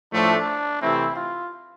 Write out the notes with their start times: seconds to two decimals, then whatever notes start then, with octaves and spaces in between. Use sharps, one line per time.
0.12 A2 F3 A3 D4
0.81 C3 E3 A3 C4 E4
1.15 F4